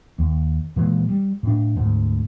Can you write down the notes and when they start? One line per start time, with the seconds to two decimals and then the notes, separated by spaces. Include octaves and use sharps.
0.19 D#2
0.76 A#2 E3 G#3
1.09 G3
1.43 A2 D4
1.76 D2 G#2